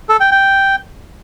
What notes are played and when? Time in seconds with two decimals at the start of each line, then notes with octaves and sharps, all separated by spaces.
0.09 A4
0.20 G5
0.31 G5